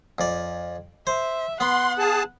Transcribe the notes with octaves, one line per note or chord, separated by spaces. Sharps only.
F2 D5
C5 E5
B3 F#5 C6
G#4 A5